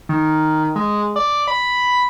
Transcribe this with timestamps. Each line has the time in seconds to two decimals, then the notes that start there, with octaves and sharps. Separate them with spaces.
0.09 D#3
0.76 G#3
1.16 D5
1.47 B5